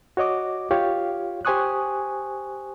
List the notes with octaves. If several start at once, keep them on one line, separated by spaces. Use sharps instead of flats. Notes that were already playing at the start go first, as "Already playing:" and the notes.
F#4 C#5 D#5 D6
F4 G4 C#5 F5
G4 C5 G#5 C#6 D#6 F#6